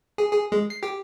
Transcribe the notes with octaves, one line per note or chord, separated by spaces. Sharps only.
G#4
G#4
G#3
C7
G4